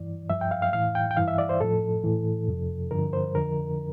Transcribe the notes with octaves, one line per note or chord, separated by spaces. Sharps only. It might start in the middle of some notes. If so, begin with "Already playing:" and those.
Already playing: G2 E3 D5
G2 F3 E5
G5
F5
F5
A2 E3 F5
G5
G5
G2 E3 F5
E5
D5
C5
A2 F3 A4
A2 E3
F2 C3 F3
G2 D3 F3 A#4
C5
F2 D3 F3 A#4